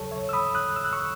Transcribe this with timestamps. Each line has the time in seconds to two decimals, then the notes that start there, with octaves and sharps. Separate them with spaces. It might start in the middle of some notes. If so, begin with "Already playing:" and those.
Already playing: D#2 C#3 F#3 A4 C#5
0.11 C#5 E5
0.29 E6
0.33 B5 D#6
0.55 D#6 F#6
0.76 E6
0.84 F#6
0.93 C#6 E6